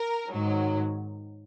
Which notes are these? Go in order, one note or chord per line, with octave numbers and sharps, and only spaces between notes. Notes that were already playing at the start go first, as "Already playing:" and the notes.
Already playing: A#4
G#2 D#3 F#3